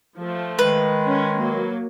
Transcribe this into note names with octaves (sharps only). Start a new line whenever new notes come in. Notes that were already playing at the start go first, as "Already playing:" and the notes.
F3 A3
D#3 G#3 B4
C#4
F#3 A#3